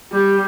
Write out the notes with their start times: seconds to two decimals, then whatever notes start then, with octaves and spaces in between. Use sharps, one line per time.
0.12 G3 G4